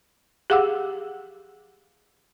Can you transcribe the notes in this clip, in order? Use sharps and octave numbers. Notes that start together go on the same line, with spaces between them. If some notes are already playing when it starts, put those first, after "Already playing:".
G4 G#4 F5 F#5 D6 E6